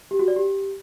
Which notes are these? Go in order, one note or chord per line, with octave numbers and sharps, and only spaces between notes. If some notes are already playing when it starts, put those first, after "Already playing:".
G4
F#4
D5
G4